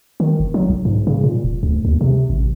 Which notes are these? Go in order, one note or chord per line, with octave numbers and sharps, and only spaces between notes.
D#3
F#1
F#3
B1
G#2
C#3
A#2
D#1
D2
D#2
C3
A1